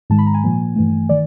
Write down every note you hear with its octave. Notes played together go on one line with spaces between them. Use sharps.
G#2 D#3 G#3 A5
B5
A#5
G#5
A#2 F3 A#3
G2 E3 A3
D#3 D5